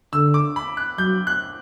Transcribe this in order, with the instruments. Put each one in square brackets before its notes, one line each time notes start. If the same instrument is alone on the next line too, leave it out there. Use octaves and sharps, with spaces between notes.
[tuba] D3 [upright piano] E6
[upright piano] D6
B5
F#6
[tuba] F#3 [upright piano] G6
[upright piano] F#6